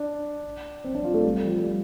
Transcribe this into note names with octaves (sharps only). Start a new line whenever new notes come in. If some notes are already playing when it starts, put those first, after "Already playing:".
Already playing: D4
C4
D4
F4
A3
G3
F3
G3